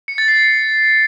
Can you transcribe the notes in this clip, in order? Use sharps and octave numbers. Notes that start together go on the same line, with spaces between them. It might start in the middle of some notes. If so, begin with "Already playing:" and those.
C#7
A6
C7